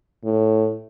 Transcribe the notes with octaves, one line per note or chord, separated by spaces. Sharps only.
A2